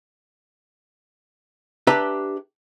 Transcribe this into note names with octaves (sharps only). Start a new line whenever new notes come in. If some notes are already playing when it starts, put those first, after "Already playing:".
D4 G4 B4 E5 A#5